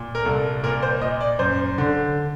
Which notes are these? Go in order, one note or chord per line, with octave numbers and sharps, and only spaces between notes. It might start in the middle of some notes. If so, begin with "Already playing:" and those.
Already playing: A#2
A#4
C2 A4
A#2 A#4
C5
A#2 D#5
D5
F#2 C5
D3